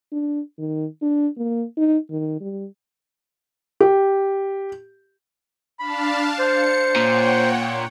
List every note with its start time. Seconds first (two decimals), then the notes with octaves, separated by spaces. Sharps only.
0.12 D4
0.58 D#3
1.02 D4
1.37 A#3
1.77 D#4
2.10 D#3
2.40 G3
3.80 G4
5.79 D4 F5 A5 B5
6.39 C5 C#7
6.96 A#2 C#5 F#5 G5